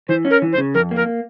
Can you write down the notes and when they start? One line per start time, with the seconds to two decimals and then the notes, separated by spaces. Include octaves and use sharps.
0.09 E3 C5
0.25 C#4
0.30 A#4
0.42 E3
0.53 C5
0.58 C#3
0.74 F2 A#4
0.91 A#3 A#4